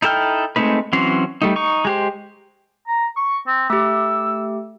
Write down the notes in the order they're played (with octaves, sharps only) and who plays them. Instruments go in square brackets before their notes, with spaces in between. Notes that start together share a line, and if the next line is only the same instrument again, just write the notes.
[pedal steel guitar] D#4 E4 A4 G5 F6
G#3 A3 C4 D#4 B4
E3 F#3 C4 C#4 C6
G3 A3 D#4
D#4 C#6
G#3 G4 C5
[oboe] A#5
C#6
C4
[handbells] A3 G4 [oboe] E6